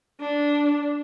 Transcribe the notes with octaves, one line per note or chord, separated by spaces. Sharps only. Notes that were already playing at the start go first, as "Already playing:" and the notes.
D4